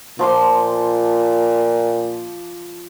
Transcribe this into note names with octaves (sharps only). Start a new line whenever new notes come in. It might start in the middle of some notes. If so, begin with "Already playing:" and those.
A#2 F3 C6 D6